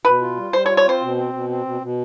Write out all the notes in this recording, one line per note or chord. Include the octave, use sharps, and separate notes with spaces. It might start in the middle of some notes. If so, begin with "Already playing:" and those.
B2 B4
F4
G3
G3 C5
C#5
F4
C#5
C4 C5
B2
C4
B2
C4
B2
B2